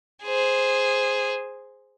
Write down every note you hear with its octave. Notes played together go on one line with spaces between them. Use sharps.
G#4 C5